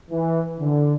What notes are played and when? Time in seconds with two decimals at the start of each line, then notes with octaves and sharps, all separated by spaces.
0.11 E3
0.60 D3